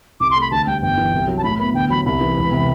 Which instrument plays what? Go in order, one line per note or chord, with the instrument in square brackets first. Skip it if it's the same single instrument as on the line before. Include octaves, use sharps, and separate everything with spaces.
[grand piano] C2 [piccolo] D6
[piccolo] C6
[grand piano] A3
[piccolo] B5
[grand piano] D2 [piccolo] A5
[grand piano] G3 [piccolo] G5
[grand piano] G1 [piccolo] G5
[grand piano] E3
C2
F#3
[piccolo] A5
[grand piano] A2 [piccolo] B5
[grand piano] B3 [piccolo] B5
[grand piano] D2 [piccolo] G5
[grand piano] F#3 [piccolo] B5
[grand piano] C2 [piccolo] B5
[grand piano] E3
E1
C3